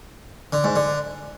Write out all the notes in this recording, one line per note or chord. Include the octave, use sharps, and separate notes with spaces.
D3
G#2
D3